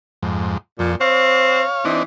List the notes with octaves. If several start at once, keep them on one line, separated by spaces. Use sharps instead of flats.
F2 G#2
F2 A#2
C4 C#5 F5
E3 C4 D4 D#4